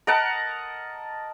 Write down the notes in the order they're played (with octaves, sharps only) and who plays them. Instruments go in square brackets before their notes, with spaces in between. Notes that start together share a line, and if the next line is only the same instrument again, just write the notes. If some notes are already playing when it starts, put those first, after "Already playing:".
[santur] A#4 D#5 F#5 A5